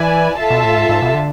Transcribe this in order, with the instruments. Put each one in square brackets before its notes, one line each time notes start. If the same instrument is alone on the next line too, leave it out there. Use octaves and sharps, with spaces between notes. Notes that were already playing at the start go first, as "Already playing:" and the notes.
Already playing: [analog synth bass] E3 [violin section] E4 B4 D5 G#5
[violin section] F4 A4 E5 A5
[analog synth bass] B2
A2
G#2
G#2
B2
C3
D3